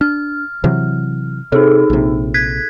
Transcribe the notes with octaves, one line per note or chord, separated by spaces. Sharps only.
D4 F6
C3 E3 F#3
C3 D#4 G#4 A4
A#1 C3
F#6 G#6 B6